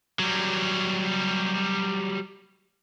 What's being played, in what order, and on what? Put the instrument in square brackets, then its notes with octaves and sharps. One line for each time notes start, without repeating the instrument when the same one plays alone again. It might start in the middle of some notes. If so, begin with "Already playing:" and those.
[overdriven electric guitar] F#3 G3